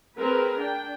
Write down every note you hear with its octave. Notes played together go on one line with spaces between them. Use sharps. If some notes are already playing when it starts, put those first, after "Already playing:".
C4 G#4 A#4 B4
D4 G5